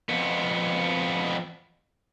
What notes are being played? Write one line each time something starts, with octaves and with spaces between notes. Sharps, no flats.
F2 B3